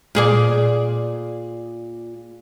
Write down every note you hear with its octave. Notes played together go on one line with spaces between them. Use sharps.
A#2 G#4 D5